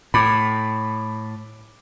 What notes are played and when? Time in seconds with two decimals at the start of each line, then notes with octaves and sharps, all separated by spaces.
0.14 A2 B5 D6